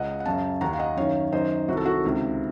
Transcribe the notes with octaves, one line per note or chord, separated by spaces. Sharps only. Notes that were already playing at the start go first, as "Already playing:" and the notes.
Already playing: C#2 C#3 D#5 F#5
F#5
F#2 C#3 F5 A5
D#2 D#3 F#5 A#5
F5
D#5 F#5
F#2 D#3 C#5 F5
F#2 D#3 C5 D#5
C2 C3 D#3 F#4
A4
F#4
C#2 C3 D#3